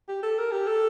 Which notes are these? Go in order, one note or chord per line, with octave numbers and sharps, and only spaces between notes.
G4
A4
A#4
G4
A4